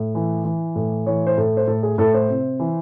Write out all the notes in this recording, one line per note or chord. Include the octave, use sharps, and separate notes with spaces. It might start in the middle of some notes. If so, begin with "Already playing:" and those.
Already playing: A2
E3
E3
A2
E3 C#5
C5
A2 A4
C5
A2 A4
G#4
A2 A4
C5
C3
E3